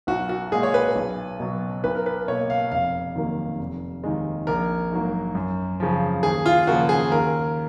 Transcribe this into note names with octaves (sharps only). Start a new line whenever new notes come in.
B1 F#4
F#4
A#2 G#3 G#4
C#5
B4
B1
B2 F#3
B1 B4
A#4
B4
B2 A#3 C#5
F5
F1 F5
D#2 D#3 F#3 A#3
F1
D#2 D#3 G#3
A#1 A#4
G#2 F#3 A#3
F#2
C#3 F3
D#2 G#4
F4
C#3 F3 A#3 F#4
G#4
D#2 A#4